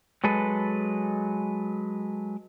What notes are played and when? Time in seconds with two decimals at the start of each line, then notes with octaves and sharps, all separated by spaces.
0.24 F#3 G#3 A4 B4